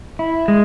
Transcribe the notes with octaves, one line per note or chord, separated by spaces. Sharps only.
E4
G#3